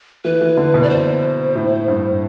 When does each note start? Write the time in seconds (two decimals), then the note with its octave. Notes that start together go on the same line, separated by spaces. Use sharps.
0.25 E3 B4
0.41 E3
0.57 D3
0.74 B2
0.83 D5
0.90 C5
1.55 A2
1.88 G2